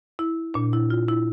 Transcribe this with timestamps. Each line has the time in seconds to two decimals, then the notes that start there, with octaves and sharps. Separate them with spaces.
0.19 E4
0.54 A#2 D4
0.73 E4
0.90 F4
1.09 E4